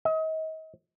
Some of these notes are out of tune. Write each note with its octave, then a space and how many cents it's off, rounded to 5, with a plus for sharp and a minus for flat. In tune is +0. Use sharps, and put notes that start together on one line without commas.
D#5 +35